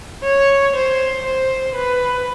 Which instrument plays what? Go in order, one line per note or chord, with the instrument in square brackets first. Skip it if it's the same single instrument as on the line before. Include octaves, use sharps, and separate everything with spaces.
[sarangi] C#5
C5
C5
B4